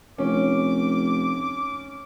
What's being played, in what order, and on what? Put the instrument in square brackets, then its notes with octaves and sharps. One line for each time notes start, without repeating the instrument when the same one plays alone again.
[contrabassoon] F1 [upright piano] C#4 [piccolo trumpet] D6